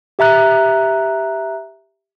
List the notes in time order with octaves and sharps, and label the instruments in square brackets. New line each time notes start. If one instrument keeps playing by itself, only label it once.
[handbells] G4 E5 A#5 F#6